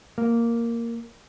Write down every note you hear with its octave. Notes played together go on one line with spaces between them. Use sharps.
A#3